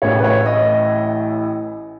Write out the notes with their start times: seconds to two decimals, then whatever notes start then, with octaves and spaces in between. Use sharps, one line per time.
0.02 A1 A2 E3 C#5
0.19 B4
0.24 C#5
0.46 D#5